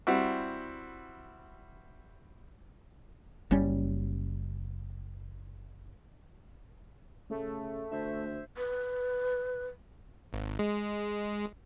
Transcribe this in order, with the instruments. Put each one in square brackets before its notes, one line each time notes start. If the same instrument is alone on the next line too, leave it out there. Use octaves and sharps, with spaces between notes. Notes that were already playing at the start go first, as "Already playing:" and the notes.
[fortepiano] G3 C4 E4 F#4
[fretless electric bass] F#1 G3 C#4
[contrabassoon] C#3 [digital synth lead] A3
[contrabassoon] D2 [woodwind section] C5 E5
[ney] B4
[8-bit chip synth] G#1
G#3